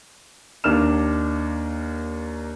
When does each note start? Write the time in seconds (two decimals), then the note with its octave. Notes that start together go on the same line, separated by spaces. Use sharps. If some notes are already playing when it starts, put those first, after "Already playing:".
0.64 D#2 A#3 D4 F6 E7